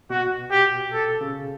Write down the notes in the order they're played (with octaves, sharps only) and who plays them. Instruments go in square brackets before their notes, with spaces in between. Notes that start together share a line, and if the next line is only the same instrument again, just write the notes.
[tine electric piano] B2 [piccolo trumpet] F#4
[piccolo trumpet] G4
A4
[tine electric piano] C#3